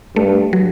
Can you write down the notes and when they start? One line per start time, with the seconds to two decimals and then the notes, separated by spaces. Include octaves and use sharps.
0.16 G2 A3
0.53 F#3